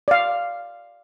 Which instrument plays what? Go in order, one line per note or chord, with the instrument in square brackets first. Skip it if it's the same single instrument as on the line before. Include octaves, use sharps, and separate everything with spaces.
[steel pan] D5 F5